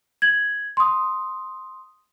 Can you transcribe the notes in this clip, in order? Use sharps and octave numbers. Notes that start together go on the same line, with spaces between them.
G#6 F#7
C6 D#6